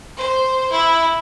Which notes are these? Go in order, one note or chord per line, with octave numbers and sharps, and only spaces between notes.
C5
E4